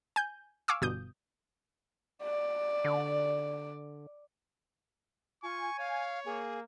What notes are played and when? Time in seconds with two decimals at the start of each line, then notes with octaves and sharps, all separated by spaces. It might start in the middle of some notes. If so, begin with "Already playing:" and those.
0.16 G#5 G6
0.68 F5 G#5 C#6 D6 E6
0.82 G1 B2 D#6 G6
2.24 D5
2.84 D3
5.43 F4 G#5 C#6
5.78 C#5 F5
6.26 A#3 G#4